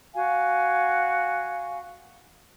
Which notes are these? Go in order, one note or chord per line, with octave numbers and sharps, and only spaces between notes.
F#4 F5 G#5